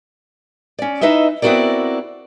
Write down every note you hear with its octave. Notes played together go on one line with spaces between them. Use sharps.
C#4 D5
D#4 E4 B4 D#5 E5
B3 C4 E4 F#4 A#4 D5